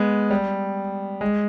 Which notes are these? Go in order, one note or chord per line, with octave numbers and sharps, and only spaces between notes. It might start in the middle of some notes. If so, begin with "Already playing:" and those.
Already playing: G#3 B3
G3
G#3